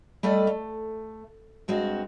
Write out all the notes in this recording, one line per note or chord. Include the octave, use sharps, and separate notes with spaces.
G3 A3 A4 D5 D#5
A3
G2 G#3 C4 F#4